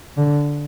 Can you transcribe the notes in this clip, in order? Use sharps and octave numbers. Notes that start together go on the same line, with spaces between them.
D3